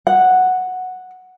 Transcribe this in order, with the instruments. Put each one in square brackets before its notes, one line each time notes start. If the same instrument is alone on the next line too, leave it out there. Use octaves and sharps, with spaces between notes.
[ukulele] F#5